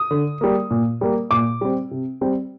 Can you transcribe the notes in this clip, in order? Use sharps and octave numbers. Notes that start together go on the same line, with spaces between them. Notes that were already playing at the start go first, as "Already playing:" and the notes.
Already playing: D#6
D3
G3 A#3
A#2
G3 A#3
A#2 D6
G3 C4
C3
G3 C4